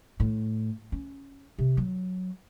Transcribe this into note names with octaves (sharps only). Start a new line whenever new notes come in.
A2
C#4
C3
F#3